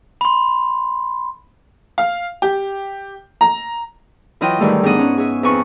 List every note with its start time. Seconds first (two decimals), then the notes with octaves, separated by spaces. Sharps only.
0.21 B5 C6
1.98 F5
2.42 G4
3.41 A#5
4.41 E3 F#3 E4 F4 D#5 G5
4.60 G#2 D#3 E3 F#3 G3 A3
4.83 G#2 B3 D4 D#5 F#5
4.99 C#4
5.18 G#4 E5
5.43 F2 D#4 B4 G#5 C#6